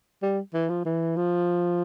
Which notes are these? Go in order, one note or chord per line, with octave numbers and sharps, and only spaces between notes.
G3
E3
F3
E3
F3